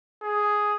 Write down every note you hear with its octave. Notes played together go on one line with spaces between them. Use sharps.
G#4